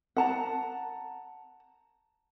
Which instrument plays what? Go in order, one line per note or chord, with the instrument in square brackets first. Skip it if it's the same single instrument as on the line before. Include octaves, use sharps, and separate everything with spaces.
[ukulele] F#5 A5 A#5